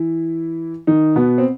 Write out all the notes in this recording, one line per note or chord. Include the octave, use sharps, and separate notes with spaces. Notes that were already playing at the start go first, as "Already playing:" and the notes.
Already playing: E3 E4
D#3 D#4
B2 B3
C4